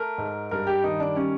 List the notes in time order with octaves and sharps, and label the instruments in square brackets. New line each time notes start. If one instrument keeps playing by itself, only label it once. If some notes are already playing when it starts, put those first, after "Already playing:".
Already playing: [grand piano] A3 A#4
G#2
G2 A#4
G4
D#3 D#4
D4
G3 C#4